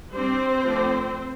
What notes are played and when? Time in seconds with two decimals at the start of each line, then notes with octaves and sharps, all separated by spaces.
0.13 G3 C4 D4 C5
0.64 F3 A3 D4